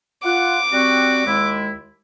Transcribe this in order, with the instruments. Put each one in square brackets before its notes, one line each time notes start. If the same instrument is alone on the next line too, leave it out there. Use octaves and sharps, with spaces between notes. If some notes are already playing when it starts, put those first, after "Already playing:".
[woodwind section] F4 F#5 [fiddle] D6
[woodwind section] G3 C4 F#4
D#2 G#3 E4